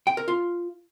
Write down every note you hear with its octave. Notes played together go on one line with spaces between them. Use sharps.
G5
A#4
F4